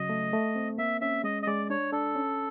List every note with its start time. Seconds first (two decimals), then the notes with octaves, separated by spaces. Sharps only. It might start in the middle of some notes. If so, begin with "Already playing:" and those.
Already playing: C#3 F#3 D#5
0.10 A3
0.33 A3
0.56 C4
0.78 A#3 E5
1.01 C#4 E5
1.24 G#3 D#5
1.43 D#5
1.47 G#3 D5
1.70 D4 C#5
1.92 D4 A4
2.15 C#4